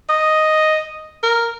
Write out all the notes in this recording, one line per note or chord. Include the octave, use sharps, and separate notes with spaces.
D#5
A#4